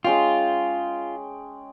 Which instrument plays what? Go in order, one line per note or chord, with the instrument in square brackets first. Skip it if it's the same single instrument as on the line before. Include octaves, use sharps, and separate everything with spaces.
[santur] G#3 C#4 G5 [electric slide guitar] F4